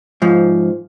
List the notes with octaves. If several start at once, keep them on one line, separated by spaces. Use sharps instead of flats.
G#2 F3